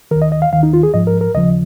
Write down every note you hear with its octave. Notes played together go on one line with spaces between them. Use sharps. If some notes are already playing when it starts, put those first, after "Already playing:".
D#2 D#3 A#4
D#5
D#5
F5
D#2 D#3 F5
D#4
F4
G#4
G#2 F3 D#5
A#4
A#4
D#2 C#3 F3 D#5